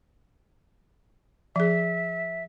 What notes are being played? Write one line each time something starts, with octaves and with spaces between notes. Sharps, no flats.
F3 G#4 E5